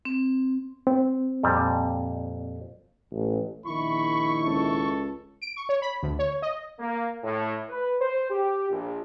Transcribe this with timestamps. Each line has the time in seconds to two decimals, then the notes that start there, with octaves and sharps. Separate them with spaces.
0.05 C4
0.87 C4
1.43 F2 A#2 G3
3.11 A1
3.66 A#1 D#3 E4 B5 C#6
4.46 C#2 A4
5.42 D7
5.57 C#6
5.69 C#5
5.82 B5
6.02 D2
6.19 C#5
6.42 D#5
6.79 A#3
7.23 A2
7.68 B4
8.00 C5
8.30 G4
8.70 A#1